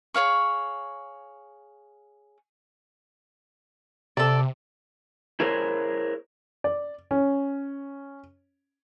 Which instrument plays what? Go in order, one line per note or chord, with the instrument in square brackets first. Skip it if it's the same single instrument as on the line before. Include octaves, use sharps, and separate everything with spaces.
[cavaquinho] G#4 C#5 F5 C#6
[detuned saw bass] C3 [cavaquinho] A4 D5
[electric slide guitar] E4 G#4 A#4 C5 C#5
[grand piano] D5
C#4